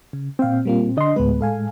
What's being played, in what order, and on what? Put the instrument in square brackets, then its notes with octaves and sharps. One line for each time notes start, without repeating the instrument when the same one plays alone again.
[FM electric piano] C#3
[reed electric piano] A#2 C4 [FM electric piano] F5 G5
[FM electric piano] G3 A#3 F4
[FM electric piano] D3 C6 [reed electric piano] D4 D#5
[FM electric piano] D2 B3 B4 [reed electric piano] A2 G#3
[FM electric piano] A4 F5 G#5